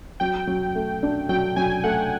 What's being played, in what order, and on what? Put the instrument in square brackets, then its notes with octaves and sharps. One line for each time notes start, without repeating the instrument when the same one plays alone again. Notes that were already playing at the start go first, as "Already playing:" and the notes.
[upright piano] F#3 [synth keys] G5
[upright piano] F#3
A3
D4
[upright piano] F#3 [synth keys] G5
[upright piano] F#3 [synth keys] G#5
[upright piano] A3 [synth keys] F#5